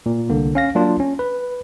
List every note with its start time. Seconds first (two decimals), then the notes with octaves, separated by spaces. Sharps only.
0.06 A#2
0.30 C2 D3 A#3
0.55 C#4 F5 A#6
0.75 F#3 A#3 D4 F4
1.00 C#4
1.19 B4